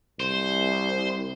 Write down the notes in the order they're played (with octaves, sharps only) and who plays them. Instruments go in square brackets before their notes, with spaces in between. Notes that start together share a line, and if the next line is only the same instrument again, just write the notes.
[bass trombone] C2 [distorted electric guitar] C5